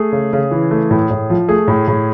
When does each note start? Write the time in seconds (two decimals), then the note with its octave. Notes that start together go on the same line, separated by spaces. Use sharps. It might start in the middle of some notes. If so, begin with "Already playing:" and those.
Already playing: A3 G#4
0.12 C#3
0.33 C#3
0.51 E3
0.71 A3
0.91 A2
1.11 A2
1.30 F3
1.48 A3 G#4
1.68 A2
1.88 A2